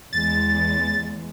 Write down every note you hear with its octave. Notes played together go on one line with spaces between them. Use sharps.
E2 G#3 A6